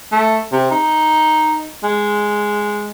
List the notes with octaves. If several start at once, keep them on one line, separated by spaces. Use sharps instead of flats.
A3
C3
D#4
G#3